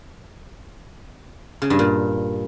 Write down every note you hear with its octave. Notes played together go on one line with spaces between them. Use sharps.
C#3
G2
A#2